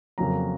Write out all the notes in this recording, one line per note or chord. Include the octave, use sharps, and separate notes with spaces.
F2 C#3 F#3 A#3 A#5